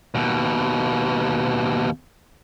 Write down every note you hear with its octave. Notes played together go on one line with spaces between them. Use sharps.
D#2 B2